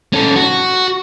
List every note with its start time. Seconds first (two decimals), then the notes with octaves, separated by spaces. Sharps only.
0.13 C#4 A4
0.36 F#4